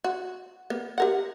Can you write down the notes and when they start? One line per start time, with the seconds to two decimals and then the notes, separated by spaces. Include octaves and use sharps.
0.04 F#4
0.70 A#3 B3
0.98 G4 A#4 F#5